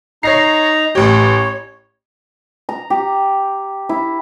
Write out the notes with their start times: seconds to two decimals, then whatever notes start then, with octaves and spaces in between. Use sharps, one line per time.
0.23 D#4 C#5 A#5 A#6 C7
0.95 A1 G4 C#5
2.69 A#5
2.90 G4
3.89 E4